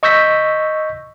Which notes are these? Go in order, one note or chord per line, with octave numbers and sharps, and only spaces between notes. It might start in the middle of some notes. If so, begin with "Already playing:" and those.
D#5 C#6 E6 G6 A#6 B6